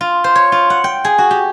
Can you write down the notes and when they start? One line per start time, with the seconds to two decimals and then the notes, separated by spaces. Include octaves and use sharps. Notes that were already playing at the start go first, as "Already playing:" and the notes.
0.01 F4
0.24 C5
0.35 C#5
0.52 F4
0.70 F#5
0.84 G5
1.05 G#4
1.18 F#4
1.31 G4